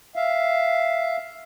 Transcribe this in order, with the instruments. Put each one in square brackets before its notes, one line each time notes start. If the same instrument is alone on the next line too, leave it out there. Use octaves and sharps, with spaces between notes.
[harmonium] E5 F5